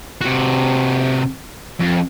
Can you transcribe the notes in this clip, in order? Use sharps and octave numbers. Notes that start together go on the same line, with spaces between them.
C3 F#4
F2